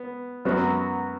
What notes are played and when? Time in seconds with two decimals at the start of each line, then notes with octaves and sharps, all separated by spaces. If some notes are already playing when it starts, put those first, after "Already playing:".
Already playing: B3
0.45 F#2 F#3 B3 F#4